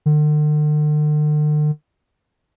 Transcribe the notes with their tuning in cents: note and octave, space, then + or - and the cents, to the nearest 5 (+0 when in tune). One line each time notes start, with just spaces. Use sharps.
D3 +45